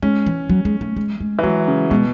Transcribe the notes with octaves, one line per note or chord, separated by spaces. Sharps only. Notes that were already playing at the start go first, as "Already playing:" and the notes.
G#3 C#4
E3
F#3
G#3
A3
G#3
G#3
E3
F#3 G#3
C#3
B2 G#3